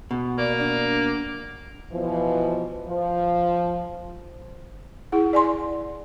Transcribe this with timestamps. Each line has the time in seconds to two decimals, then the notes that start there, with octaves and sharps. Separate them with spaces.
0.11 B2
0.38 A#3 D5
0.59 D4
1.92 B2 E3 F3
2.88 F3
5.12 E4 G#4 F#5
5.33 D5 G#5 C6